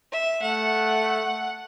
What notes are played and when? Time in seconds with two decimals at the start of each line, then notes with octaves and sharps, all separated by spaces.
0.12 E5
0.42 A3 F#5